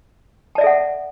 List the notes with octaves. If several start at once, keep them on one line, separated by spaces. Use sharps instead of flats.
A4 D5 E5 F#5 A5